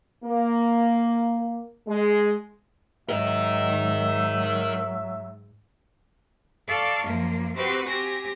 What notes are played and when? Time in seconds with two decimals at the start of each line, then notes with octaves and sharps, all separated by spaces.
0.24 A#3
1.87 G#3
3.09 G#2 F#3 A#4 D#5 E5
6.67 A4 D5 F5 A5 C#6
7.06 F#2 F3 A#3
7.55 C4 F#4 G4 B4 C5
7.86 C4 G4 G#5 A#6